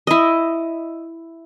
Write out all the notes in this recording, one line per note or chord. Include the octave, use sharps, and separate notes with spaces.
E4 D#5